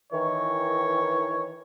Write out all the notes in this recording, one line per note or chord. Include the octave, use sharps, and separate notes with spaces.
D#3 E3 C#5